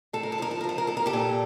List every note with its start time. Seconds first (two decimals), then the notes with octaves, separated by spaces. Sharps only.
0.13 A2 A4
0.23 A#4
0.32 A4
0.38 F3 A#4
0.51 A4
0.61 A#4
0.64 F3 A4
0.78 A#4
0.87 A2 A4
0.97 A#4
1.06 G4 A4
1.13 A#2